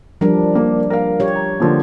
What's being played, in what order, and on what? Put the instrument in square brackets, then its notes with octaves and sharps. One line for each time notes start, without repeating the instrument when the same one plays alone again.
[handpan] F3 G3 D4 [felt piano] A#4
[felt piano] A#3
A#4 F5
[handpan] G4 C#5
[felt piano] A#5
D3 F3 A#3